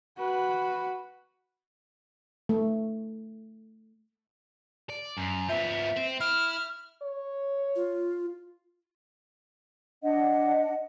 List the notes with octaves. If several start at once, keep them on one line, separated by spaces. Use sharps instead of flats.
F#4 B4
A3
D5
F#2
F3 B3 E5
C4
E4 F6
C#5
F4
D4 D#5 F#5